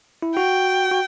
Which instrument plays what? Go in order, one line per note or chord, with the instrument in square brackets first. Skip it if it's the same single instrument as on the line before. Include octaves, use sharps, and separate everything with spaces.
[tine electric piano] E4
[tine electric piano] F#4 [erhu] G5
[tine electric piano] F#4